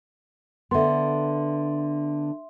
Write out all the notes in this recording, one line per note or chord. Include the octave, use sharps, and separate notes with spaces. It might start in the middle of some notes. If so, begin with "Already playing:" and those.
D3 B3 E5 C6